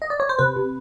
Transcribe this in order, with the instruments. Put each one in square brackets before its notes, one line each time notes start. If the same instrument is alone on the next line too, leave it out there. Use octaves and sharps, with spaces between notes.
[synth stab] D#5
D5
C#5
C5
C3 B4
C3